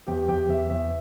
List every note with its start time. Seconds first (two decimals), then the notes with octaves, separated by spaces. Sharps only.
0.07 E2 G4 G5
0.28 E2 G4 G5
0.49 E2 E5
0.70 E2 E5